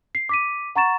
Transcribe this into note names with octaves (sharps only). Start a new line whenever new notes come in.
C7
D6 B6 D#7
F#5 A#5 C#6 A6 E7